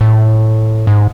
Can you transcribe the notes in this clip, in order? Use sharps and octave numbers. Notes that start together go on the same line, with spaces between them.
A2
G#2